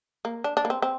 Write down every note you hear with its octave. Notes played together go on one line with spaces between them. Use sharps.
A#3
D4
D4
A#3
C4
C4